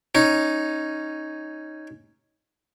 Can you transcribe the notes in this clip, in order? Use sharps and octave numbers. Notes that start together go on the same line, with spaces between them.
C#4 D#4